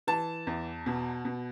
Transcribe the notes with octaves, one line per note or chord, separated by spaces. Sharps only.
E3 A5
E2
B2
B2